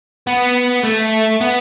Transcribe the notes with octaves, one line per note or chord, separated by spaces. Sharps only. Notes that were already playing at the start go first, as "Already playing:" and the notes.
B3
A3
B3